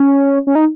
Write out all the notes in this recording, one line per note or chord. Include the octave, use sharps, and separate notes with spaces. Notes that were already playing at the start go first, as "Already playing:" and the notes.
Already playing: C#4
C#4
D#4